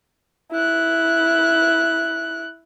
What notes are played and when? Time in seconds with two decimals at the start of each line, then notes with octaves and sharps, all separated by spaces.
0.52 E4 F#6